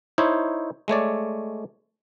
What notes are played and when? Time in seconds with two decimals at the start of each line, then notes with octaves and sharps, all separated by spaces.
0.18 D#4 E4 C5 C#5
0.88 G#3 A3 C#5 D5